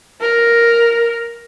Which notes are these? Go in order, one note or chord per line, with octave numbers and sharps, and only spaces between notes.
A#4